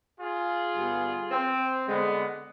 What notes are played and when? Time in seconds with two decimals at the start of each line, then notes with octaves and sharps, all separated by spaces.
0.20 F4 G#4
0.76 G2 D3 G3 B3
1.31 C4
1.86 D3 G#3 B3